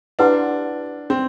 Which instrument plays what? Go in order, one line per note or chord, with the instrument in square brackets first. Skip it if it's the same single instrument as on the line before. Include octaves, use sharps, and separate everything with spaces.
[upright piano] D4 [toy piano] E4 G4 B4 F#5 C6
[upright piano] C4